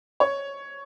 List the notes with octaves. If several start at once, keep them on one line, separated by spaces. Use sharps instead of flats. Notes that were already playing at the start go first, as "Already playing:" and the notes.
C#5